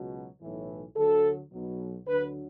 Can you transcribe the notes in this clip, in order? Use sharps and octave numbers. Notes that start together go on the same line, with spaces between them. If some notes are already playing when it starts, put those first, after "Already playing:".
Already playing: C#2 B2 F#3
B1 A2 E3
D2 D3 F#3 A4
B1 B2 F#3
D2 D3 F#3 B4